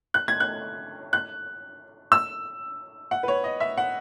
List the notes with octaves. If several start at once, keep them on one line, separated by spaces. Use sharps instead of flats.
F#6
G#6
F#6
F#6
E6
F#5
B4
C#5
D#5
E5
F#5